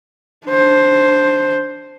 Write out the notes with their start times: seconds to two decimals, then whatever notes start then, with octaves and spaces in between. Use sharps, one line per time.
0.47 D4 C5